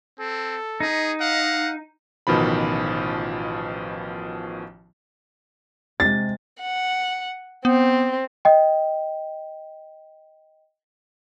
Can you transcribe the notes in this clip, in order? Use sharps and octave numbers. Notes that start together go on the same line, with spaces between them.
C4 A4
D#4 G#4
F5 F#5
A1 B2 D#3 F3 B5
C3 G#3 A6
F#5
B3 C4
D#5 G5